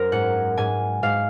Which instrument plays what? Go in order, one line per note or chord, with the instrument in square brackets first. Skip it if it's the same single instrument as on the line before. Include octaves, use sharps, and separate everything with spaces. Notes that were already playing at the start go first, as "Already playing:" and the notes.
Already playing: [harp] F#2 A#4 C5
G#2 F#5
G#2 G#5
G#2 F5